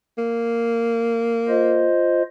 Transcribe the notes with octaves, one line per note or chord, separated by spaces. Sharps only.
A#3
F4 C5 D#5